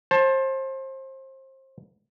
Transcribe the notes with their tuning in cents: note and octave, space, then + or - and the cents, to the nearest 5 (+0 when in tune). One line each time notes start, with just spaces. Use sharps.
C5 +30 A5 +0